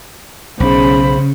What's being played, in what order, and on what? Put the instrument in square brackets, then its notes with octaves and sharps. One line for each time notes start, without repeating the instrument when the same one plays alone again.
[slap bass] B1 [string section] C#3 [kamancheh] C5 B5